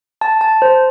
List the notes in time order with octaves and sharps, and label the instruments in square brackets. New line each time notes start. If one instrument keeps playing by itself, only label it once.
[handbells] A5
A5
C5